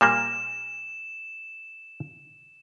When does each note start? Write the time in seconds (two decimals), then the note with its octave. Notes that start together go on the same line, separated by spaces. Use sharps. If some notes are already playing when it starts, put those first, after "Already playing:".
0.01 A#2 G3 A#3 E7